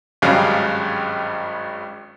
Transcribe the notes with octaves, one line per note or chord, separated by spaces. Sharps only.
G#1 G2 C#3 F#3 F5